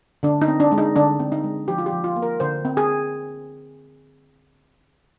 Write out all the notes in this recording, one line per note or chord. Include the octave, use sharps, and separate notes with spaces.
D3 D4
D#4
C4
D4
G#3
D#4
D3 D4
C4
D#4
G#3
F3 G4
F4
G4
F3
F4
A#3
A#4
D3 C5
C4
G#4